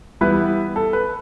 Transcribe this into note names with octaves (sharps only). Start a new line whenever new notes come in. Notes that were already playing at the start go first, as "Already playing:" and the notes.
E3 G3 B3 E4 B4
A4
B4